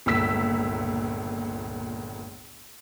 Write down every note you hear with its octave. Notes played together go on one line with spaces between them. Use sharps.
G1 C#2 A#2 E6 B6